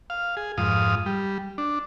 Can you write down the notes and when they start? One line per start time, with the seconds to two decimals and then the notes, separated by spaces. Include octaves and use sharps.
0.10 F5
0.37 G#4
0.58 F2 G#2 F5 D#6
1.06 G3
1.58 D4